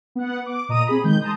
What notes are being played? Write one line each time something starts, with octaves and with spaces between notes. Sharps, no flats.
B3 F#5
D6
A#2 D#5 A#5 D#6 D#7
C4 G#4 B5
D#3 G#3 G6
A5 A#5 C6 D#6